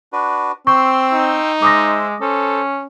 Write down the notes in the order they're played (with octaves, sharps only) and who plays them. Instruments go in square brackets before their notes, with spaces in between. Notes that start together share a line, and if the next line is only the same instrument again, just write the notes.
[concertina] D4 F#4 B4
[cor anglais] C4 [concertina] G5 C6 E6 [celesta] C#6
[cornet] D#4
[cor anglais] G#3 [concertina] C5 E5 [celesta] D6 D#6 A#6
[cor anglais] C#4 [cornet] A4 [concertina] C5